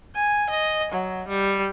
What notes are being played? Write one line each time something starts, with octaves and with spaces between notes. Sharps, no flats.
G#5
D#5
F#3
G3